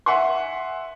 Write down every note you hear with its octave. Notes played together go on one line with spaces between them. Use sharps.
E5 F#5 G#5 C6